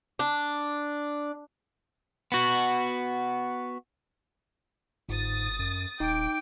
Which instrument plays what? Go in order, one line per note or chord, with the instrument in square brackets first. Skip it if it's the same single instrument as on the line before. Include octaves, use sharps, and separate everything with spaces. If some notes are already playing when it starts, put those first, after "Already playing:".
[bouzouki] D4
[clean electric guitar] B3 F#4
[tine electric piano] G1 [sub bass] G#2 [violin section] D#6 A6
[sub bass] F#2
[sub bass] D#1 [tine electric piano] D#4 [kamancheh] G5 D6